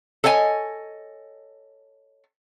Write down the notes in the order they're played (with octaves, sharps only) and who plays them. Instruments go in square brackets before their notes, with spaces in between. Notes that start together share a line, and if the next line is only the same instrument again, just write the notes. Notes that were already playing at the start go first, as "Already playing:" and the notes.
[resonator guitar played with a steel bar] A4 C#5 D#5 F#5 G#5